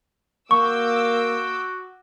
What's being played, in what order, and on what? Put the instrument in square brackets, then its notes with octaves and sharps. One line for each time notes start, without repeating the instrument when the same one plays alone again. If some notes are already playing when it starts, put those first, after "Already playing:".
[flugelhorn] A#3 [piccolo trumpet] F#4 [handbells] C#6 [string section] D6 E6 G6